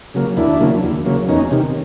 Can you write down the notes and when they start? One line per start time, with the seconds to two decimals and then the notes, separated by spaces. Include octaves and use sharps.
0.14 C#3 F#3 A#3
0.37 D#2 D4 E4
0.60 C#3 F#3 A#3
0.83 D#2
1.06 C#3 F#3 A#3
1.28 E2 C#4 D#4
1.51 C3 D#3